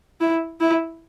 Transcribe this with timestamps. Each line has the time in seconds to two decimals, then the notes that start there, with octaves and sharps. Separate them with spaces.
0.20 E4
0.60 E4